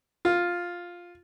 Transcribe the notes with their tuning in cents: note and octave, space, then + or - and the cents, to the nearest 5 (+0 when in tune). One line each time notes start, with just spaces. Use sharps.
F4 +5